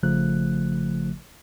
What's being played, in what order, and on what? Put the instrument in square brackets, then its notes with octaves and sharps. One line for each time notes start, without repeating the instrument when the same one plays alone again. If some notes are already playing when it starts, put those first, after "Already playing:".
[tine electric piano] G#1 C#3 F3 A3 F#6